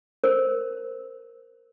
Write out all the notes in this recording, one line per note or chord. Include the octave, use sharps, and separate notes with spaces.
A#4 C5